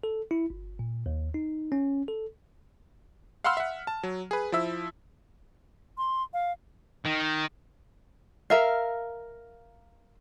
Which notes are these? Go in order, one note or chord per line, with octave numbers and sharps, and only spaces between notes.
A4
E4
G1
A#2
D#2
D#4
C#4
A4
F5 F#5 B5 C6 E6 F6
E5 F#5
A5
F#3
G#4 B4
F3 E4 E5 E6
C6
F5
D#3
A#4 E5 F5